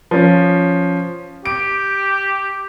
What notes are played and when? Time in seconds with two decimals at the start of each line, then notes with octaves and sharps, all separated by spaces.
0.11 F3 C#4
1.46 G4 D7